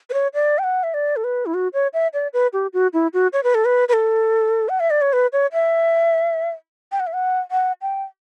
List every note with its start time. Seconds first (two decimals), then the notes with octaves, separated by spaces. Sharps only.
0.10 B4
0.14 C#5
0.34 D5
0.59 G5
0.64 F#5
0.83 E5
0.94 D5
1.16 A4
1.24 B4
1.46 E4
1.54 F#4
1.74 C#5
1.94 E5
2.14 D5
2.33 B4
2.53 G4
2.73 F#4
2.93 E4
3.14 F#4
3.33 C#5
3.43 B4
3.55 A4
3.65 B4
3.89 B4
3.93 A4
4.69 F#5
4.80 E5
4.90 D5
5.02 C#5
5.13 B4
5.33 C#5
5.53 E5
6.92 G5
7.00 F#5
7.07 E5
7.13 F#5
7.51 F#5
7.82 G5